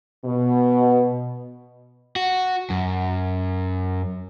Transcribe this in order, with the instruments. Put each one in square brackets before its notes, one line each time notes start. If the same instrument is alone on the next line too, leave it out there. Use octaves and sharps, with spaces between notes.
[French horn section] B2
[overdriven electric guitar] F#4
F#2